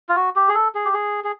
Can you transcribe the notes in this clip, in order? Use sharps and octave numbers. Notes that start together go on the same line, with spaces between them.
F4
F#4
G4
G#4
A4
G#4
G4
G#4
G#4